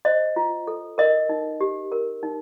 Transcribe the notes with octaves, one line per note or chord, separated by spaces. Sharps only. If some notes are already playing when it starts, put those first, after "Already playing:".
C5 D#5
F4
A4
A#4 D#5
D#4
G4
A#4
D#4